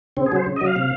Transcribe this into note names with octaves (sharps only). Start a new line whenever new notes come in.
C#3 C4
G#4
F#3 C5
C#3
D#5
F#3
F5
C3